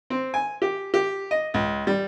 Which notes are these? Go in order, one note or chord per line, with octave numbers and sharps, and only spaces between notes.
C4
G#5
G4
G4
D#5
C#2
G3